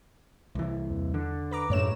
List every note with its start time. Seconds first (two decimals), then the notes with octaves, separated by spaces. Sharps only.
0.55 C2 E3
0.90 E2
1.14 D3
1.51 B4 A#5 D6
1.70 F#2 A2 A3 C#5 E7